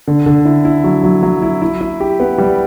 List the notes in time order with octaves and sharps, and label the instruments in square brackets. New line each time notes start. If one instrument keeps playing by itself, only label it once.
[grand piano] D3
D3
E4
E4
F#3
F#3
F#3
E4
E4
E4
G4
B3
G3